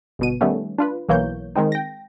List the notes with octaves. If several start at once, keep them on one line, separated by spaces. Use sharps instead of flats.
G1 B2 D#7
D#3 G3 A3 B3 C#4
D4 F4 B4
B1 E3 A#3 C#5 G6
D#3 G#3 C4 D#4
G5 A#6